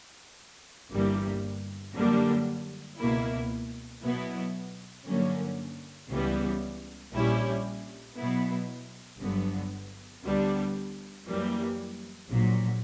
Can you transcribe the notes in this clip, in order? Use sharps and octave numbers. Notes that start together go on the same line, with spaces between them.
G1 G2 E3 G3 A#3
F#2 D3 G3 A#3 D4
C#2 B2 A#3 E4
B2 F#3 B3 E4
G2 D3 F#3 A#3 C#4
C#2 C#3 E3 G3 B3
A#1 A#2 G3 C#4 E4
B2 F#3 B3 E4
G1 G2 D3 F#3 B3
D2 D3 G3 B3 D4
F#2 E3 G3 A#3
A#1 A#2 F#3